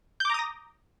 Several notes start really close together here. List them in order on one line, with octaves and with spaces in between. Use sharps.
G6 D6 A#5 D#6 A#6